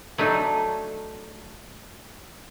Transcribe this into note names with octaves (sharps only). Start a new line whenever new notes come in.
F#3 A3 D4 D#4